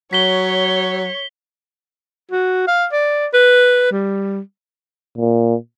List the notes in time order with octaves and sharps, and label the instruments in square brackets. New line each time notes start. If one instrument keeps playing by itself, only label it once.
[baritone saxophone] F#3 [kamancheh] C#5 [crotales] B6 G7
[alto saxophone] F#4
F5
D5
B4
G3
[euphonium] A#2